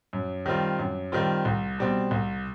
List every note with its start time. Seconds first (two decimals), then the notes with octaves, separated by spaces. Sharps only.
0.13 F#2
0.46 D#3 G3 C4 F4
0.79 F#2
1.12 D#3 G3 C4 F4
1.45 C2
1.79 B2 G3 C4
2.11 C2